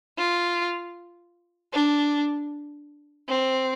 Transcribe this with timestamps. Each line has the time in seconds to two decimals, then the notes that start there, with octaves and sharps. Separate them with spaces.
0.18 F4
1.73 D4
3.29 C4